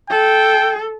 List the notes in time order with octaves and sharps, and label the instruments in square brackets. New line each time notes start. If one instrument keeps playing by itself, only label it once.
[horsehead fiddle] A4 [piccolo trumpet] G5